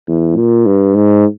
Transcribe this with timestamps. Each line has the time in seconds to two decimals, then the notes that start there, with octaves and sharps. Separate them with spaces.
0.08 E2
0.37 A#2
0.66 G2
0.95 G#2